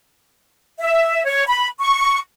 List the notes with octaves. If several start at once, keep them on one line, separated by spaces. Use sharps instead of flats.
E5
C#5
B5
C#6